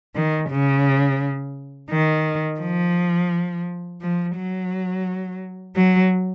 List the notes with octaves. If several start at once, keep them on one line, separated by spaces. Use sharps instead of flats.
D#3
C#3
D#3
F3
F3
F#3
F#3